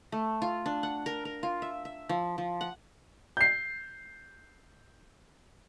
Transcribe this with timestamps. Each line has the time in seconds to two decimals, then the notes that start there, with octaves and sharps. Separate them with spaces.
0.12 A3
0.42 F4
0.66 D4
0.83 F#5
1.06 A#4
1.25 A#4
1.43 F4
1.62 E5
1.85 E5
2.09 F3
2.38 F3
2.61 F#5
3.37 G6 C7